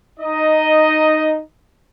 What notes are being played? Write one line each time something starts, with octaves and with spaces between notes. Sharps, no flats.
D#4 D#5